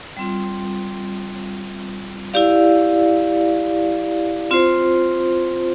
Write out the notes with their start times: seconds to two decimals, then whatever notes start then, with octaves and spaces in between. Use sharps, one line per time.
0.17 G3 C4 F4
2.34 E4 G4 D5 F5
4.51 C4 F4 C5